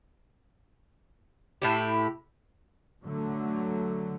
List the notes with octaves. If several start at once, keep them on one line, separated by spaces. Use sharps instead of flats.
A2 E4 G4
D3 F#3 A3